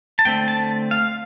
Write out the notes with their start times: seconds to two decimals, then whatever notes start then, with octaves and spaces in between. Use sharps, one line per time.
0.19 A5
0.25 D3 A3 C4 G5
0.48 A5
0.91 F5